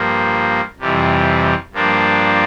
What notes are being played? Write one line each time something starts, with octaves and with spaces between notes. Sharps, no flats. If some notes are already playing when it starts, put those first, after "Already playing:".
Already playing: G2 F3 A#3
F2 C3 E3 G3
G2 F3 A#3 D4